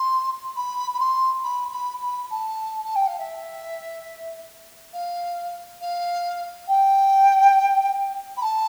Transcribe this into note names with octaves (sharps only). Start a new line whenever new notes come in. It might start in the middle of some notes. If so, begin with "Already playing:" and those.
Already playing: C6
B5
B5
C6
B5
B5
B5
A5
A5
G5
F5
E5
F5
F5
G5
B5
A5